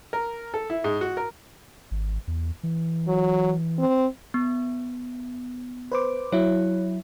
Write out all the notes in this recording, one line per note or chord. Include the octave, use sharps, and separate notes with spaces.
A#4
A4
E4
G#2
F#4
A#4
G#1
E2
E3
F#3
C4
B3
B4 C5 D6
F#3 E4 C#5